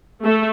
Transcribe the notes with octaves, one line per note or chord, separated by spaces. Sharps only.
A3